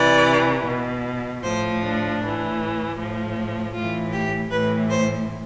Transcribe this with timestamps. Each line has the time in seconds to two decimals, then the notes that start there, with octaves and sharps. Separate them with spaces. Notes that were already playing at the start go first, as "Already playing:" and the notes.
Already playing: C3 E3 D5
0.66 B2
1.43 A2 F3 C5
1.82 D4
2.20 A2 E3
2.97 A2 F3
3.74 A2 E3 F4
4.13 G4
4.51 A2 E3 B4
4.90 C5